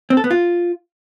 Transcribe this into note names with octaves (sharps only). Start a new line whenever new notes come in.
C4
A4
B3
F4